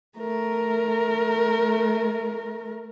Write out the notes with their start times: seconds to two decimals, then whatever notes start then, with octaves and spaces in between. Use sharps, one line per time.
0.18 A3 A#4